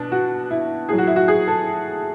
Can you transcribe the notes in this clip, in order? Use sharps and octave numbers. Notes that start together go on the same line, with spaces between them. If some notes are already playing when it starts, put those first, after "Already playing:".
Already playing: B2 D4
F#4
E4
A2 F#3 G#4
F#4
E4
F#4
G#4
A4